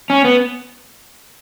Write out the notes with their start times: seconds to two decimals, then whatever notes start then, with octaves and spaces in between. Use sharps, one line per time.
0.10 C#4
0.25 B3